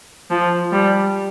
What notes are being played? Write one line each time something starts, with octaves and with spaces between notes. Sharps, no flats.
F3
G3